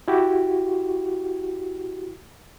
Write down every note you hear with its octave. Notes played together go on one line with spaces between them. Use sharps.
E4 F#4 G4